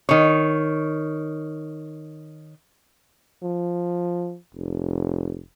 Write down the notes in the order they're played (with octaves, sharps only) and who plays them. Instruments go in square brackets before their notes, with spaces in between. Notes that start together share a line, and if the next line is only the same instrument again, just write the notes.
[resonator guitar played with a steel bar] D#3 C#5
[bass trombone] F3
F1